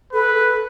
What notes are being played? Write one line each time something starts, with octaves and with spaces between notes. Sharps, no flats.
A4 B4
A4